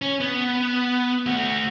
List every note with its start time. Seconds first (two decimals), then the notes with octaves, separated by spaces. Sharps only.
0.02 C#4
0.20 B3
1.26 A3 F#4